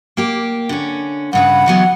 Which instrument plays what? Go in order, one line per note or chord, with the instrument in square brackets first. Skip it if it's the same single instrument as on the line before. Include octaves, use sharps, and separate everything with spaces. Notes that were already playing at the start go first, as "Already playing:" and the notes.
[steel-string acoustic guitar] A#3 G4
D3 C#4
[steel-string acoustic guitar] G2 C#3 B4 [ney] F#5
[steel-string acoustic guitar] E3 F#3 B3